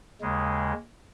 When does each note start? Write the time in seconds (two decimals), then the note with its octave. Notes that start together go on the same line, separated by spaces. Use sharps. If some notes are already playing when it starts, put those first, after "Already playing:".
0.21 D#2 C#3 G#3